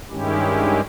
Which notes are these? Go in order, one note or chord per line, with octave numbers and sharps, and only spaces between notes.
G2 D#3 G#3 C#4 E4 G4